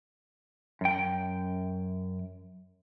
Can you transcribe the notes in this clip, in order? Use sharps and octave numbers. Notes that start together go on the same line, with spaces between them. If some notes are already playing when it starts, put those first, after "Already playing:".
F#2 G5